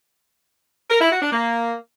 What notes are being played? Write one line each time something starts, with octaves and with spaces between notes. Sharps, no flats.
A#4
E4
F#4
D4
A#3